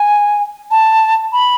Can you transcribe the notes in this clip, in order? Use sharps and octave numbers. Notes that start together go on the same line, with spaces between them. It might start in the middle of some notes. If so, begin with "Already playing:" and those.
Already playing: G#5
A5
B5